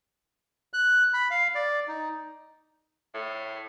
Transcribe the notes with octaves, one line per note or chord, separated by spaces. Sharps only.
F#6
B5
F5
D5
D#4
A2